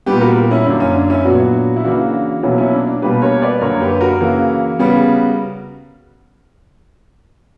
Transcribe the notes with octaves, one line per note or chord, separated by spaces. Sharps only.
A#2 G3 B3 G4 B4
F#4 A#4
C#4 E4
F#2 D3 A#3 D4
C#4
D4
C#4 E4
A#2 F#3 B3 D4 F#4
E4
C#3 E3 A#3 D4 F#4
B2 F#3 A#3 C#4 E4
C#4 E4
D4
D4
B2 G3 A#3 G4 B4
A#4 C#5
B4 D5
F#2 D3 A#3 A#4 C#5
G4 B4
B4
F#4 A#4
C#3 E3 A#3
C#3 G3 B3